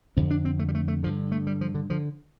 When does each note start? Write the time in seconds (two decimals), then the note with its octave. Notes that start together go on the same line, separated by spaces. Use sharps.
0.17 F2 D3 C4
0.31 D4
0.45 C4
0.59 A3
0.68 G3
0.75 A3
0.88 A3
1.03 G2 D3 F3
1.32 A3
1.47 G3
1.61 F3
1.74 D3
1.90 D3 F3